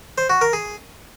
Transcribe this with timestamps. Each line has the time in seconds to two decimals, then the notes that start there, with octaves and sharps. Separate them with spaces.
0.18 C5
0.30 F#4
0.41 A#4
0.53 G#4